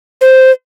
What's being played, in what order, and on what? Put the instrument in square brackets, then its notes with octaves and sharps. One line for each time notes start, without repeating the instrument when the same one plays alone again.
[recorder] C5